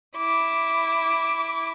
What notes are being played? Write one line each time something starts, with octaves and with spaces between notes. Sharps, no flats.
E4 D6